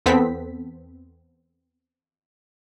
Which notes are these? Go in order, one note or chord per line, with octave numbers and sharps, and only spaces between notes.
E2 B3 C4 A4 B6